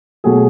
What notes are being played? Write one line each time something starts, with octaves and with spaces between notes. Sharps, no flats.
B2 F#3 A3 G#4